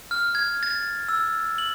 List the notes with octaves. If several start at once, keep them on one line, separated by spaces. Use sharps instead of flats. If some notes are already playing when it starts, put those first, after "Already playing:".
F6
G#6
A6
E6
F#7